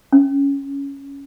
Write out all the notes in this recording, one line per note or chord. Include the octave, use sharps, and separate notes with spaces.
C#4